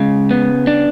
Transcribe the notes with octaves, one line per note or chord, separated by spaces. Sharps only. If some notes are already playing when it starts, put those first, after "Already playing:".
Already playing: C#3 G#3 F5
B3
D4